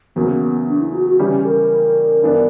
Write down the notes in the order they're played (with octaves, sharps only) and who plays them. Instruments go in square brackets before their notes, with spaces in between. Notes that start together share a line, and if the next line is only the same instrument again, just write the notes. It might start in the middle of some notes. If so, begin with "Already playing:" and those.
[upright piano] E2 C#3 F#3 A#3 [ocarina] B3
[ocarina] D4
E4
F#4
F#4
[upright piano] C#3 E3 G3 C#4 [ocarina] G4
[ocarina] A#4
[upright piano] G2 E3 B3 D4